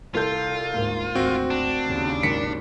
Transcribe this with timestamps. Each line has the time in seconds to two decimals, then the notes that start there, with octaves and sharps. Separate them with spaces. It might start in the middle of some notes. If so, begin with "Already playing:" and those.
0.15 C2 F4 A4 G6
0.74 D2 G#2 A#3
1.15 G#1 D2 C4 F#4
1.50 D4
1.86 D#2 C#3
2.23 G#1 B6 C#7